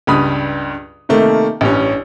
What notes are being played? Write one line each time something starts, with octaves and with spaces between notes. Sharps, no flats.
C#2 G2 G3 B5 D#6
C3 D#3 A3 A#3
A1 G2 C#4